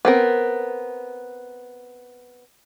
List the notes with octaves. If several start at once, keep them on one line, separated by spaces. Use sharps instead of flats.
B3 C4 A#4